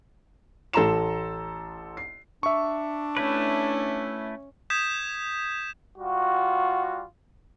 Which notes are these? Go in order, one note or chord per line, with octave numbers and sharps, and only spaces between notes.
A1 A4 A5 A#5 C6 E7
C7
D4 E5 C#6
A3 C#4 E4 B4
D#6 G6 G#6 B6 E7
G3 F4 F#4